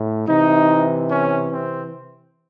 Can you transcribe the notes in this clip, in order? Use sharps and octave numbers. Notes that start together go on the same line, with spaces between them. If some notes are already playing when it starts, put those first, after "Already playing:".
Already playing: A2
C3 E3 D#4
C#4
C4